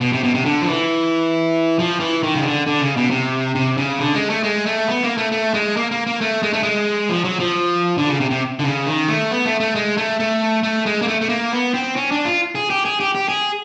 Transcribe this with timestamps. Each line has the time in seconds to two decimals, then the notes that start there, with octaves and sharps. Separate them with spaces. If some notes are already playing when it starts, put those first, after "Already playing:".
0.01 B2
0.13 C3
0.23 B2
0.34 C3
0.45 D3
0.62 F3
0.68 E3
1.79 F3
2.00 E3
2.23 D#3
2.35 C#3
2.45 D3
2.67 D3
2.81 C#3
2.97 B2
3.11 C3
3.55 C3
3.77 C#3
3.99 D3
4.15 G#3
4.30 A3
4.43 G#3
4.66 A3
4.88 B3
5.03 A#3
5.18 A3
5.32 A3
5.54 G#3
5.77 A#3
5.91 A#3
6.07 A#3
6.21 A3
6.43 G#3
6.53 A3
6.63 G#3
7.09 F3
7.24 F#3
7.39 F3
7.98 D3
8.09 C#3
8.20 C3
8.31 C3
8.59 D3
8.64 C#3
8.86 D#3
9.08 A3
9.31 B3
9.45 A3
9.60 A3
9.75 G#3
9.97 A3
10.20 A3
10.63 A3
10.86 G#3
11.02 A#3
11.08 A3
11.21 A3
11.29 A#3
11.52 B3
11.74 C4
11.96 C#4
12.11 D4
12.25 F4
12.55 G#4
12.70 G4
12.85 G#4
13.00 G4
13.15 G4
13.28 G#4